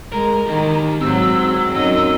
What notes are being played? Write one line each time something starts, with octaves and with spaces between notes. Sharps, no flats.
G#3 A#4 A#5
D#3 G4 D#5
G#2 F#3 C4 E6
F#2 D#4 D#5 E6